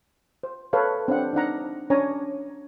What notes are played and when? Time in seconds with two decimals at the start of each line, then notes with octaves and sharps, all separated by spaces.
0.43 C5
0.73 A4 B4 C#5 F5
1.08 C4 D4 F#5
1.34 D4 D#4 F#5 A#5
1.90 C#4 D4 C#5 G#5 A#5